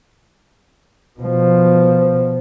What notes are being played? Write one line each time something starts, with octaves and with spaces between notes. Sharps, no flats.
B2 F3